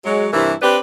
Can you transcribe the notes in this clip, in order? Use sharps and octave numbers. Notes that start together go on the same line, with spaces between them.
F#3 G#3
G2 C3 E3 E4 A#4
C4 D4 G4 B4